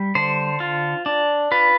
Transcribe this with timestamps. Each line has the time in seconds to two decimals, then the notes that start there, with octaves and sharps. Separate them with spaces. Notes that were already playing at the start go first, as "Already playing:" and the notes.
Already playing: G3
0.15 D3 C5
0.60 F4
1.06 D4
1.52 F4 B4